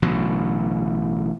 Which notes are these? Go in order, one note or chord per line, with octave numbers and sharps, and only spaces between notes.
A1 B2 D3 F#3